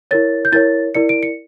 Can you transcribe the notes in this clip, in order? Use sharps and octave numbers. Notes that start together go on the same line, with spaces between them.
E4 A#4 C#5 A6
G6
E4 A#4 C#5 A6
E4 A#4 D5 C#7
D7
C#7